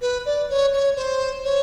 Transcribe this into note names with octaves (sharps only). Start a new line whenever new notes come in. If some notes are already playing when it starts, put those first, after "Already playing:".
B4
D5
C#5
C#5
C5
C#5